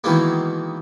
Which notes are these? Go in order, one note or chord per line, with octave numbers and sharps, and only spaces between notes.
B2 D#3 E3 G#3 A#3